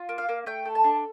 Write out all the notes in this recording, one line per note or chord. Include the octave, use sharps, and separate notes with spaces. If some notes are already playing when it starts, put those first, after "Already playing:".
Already playing: F4
A#3
F5
A#3
A3 G5
A4
A5
D4